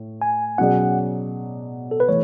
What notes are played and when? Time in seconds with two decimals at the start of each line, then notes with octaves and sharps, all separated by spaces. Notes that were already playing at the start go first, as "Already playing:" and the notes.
Already playing: A2
0.22 G#5
0.58 B2 F#3 C#4 G#4 D5 F#5
1.91 A4
2.00 B4
2.08 E3 A3 C#5